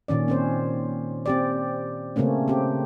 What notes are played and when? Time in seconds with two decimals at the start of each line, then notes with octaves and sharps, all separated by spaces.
0.08 A#2 D#3 C#4 D5
0.28 C4 C#4 C5
1.26 C4 G4 D5
2.16 C#3 A3 A#3 C4 C#4
2.48 C4 G4